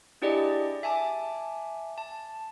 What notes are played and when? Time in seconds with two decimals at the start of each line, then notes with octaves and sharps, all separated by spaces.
0.22 D4 E4 G4 G#4 D5 D#5
0.83 E5 G#5 A5 D6
1.98 A5